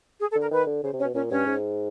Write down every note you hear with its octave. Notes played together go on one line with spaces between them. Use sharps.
G#4
A4
D3
A#4
D#3 B4
D3
C#3 C5
C3
C#4 C#5
B2
A#2 C#4 C#5
G2 C#4 C#5
G#2